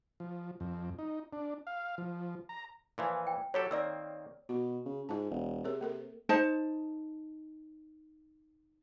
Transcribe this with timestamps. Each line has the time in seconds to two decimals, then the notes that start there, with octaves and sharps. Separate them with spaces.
0.20 F3
0.60 F2
0.99 D#4
1.33 D4
1.67 F5
1.98 F3
2.49 A#5
2.98 A#2 E3 F3
3.27 G5
3.54 F#3 G4 A4 C#5
3.71 D#3 A#3 C4 D5 E6
4.49 B2 F#4
4.85 C#3
5.09 G#2 F4 A5
5.31 E1
5.64 C3 G#4 A#4 C#5
5.81 A#3 A4 A#4
6.29 D#4 C5 A5